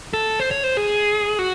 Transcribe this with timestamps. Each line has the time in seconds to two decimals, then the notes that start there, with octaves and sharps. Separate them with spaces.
0.13 A4
0.40 C5
0.51 C#5
0.64 C5
0.77 G#4
1.39 F#4